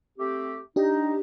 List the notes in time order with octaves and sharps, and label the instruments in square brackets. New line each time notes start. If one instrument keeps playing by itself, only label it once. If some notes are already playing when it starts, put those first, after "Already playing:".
[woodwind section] A3 C4 G4
[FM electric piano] D4 G4 [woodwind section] D#4